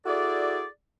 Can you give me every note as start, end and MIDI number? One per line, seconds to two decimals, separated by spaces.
0.05 0.65 64
0.05 0.65 66
0.05 0.65 68
0.05 0.65 69
0.05 0.65 74